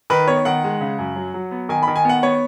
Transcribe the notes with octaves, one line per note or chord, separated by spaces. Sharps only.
D#3 B4
B3 C#5
D#3 F#5
G#3
C#3
F#2
F#3
F#3
B3
D#3 G#5
B5
D#3
G#5
B3 F#5
B3 C#5